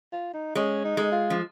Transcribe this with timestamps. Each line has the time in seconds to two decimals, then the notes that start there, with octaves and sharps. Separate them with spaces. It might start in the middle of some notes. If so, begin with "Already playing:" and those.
0.12 F4
0.34 D#4
0.55 G#3 C#4
0.84 D#4
0.97 G#3
1.12 F4
1.30 F3